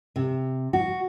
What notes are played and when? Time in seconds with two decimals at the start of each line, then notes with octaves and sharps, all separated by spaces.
0.16 C3
0.73 F#4